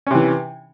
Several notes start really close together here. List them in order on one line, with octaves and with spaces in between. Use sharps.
C#4 C3 E3